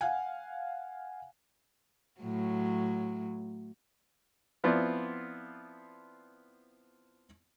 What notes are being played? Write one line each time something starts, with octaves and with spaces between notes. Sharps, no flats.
F5 F#5 G#5
A2 F#3
F3 B3 C4 E4 F4 D5